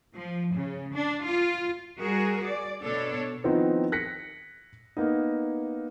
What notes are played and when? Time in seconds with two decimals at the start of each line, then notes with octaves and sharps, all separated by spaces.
0.15 F3
0.54 C#3
0.94 D4
1.25 F4
1.99 G3 F#4 G#4 A#4
2.44 D5
2.83 B2 D4 A4 C#5
3.44 D#3 F3 B3 C4 D#4 E4
3.92 F#6 A#6 B6 C#7
4.97 A#3 B3 D#4